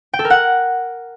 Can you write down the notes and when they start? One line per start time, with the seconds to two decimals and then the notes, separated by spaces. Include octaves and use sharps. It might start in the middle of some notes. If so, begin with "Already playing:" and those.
0.13 G5
0.19 A4
0.25 A#4
0.30 F#5